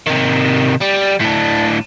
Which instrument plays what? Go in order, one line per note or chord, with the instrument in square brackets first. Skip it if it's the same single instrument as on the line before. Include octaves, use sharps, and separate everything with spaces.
[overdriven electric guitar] C3 D#3
G3
A2 D4